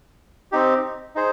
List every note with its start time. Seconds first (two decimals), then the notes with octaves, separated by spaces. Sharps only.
0.52 C4 D#4 G4
1.15 D#4 G#4 C5